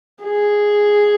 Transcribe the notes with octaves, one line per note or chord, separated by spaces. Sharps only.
G#4